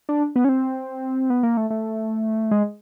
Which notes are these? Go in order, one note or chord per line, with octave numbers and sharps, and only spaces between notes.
D4
B3
C#4
C4
B3
A#3
A3
A3
G#3